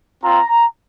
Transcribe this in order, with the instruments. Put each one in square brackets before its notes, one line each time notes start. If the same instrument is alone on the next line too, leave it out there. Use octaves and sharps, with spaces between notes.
[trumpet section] C4 F4 A#5